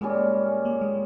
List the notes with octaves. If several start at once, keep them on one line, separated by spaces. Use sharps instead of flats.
A#2 G3 G#3 C#4
A#3
G#3